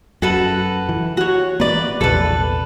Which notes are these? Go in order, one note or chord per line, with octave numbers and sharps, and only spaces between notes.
F#2 F#4 A4 B4
E3
F#4 C#5
E3 F3 A#3 B4 D5
A#1 E2 C3 A4 B4